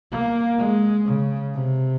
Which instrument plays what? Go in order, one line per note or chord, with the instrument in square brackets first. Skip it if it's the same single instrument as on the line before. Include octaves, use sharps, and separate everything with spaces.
[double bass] A#3
G#3
C#3
C3